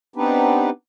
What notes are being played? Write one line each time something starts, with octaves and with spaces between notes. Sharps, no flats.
B3 C4 D4 D#4 G4 B4